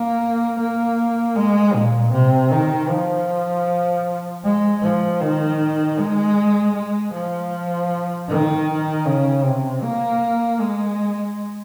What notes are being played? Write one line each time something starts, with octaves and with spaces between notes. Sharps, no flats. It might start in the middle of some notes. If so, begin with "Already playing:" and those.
Already playing: A#3
A#3
G#3
A#2
C3
D#3
F3
G#3
F3
D#3
G#3
G#3
F3
D#3
C#3
C3
A#3
G#3